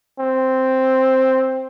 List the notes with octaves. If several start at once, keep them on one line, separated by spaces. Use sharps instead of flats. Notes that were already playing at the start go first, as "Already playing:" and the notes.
C4